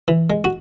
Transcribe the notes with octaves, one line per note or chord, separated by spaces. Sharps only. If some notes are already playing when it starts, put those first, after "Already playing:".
E3
G#3
F#4